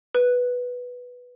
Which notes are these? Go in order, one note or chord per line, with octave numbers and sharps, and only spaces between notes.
B4